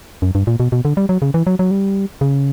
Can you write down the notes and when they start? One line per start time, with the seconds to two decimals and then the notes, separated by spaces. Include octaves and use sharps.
0.22 F#2
0.35 G2
0.47 A#2
0.60 B2
0.72 B2
0.85 D3
0.97 G3
1.09 F#3
1.22 C#3
1.34 E3
1.47 F#3
1.59 F#3
1.71 G3
2.21 C#3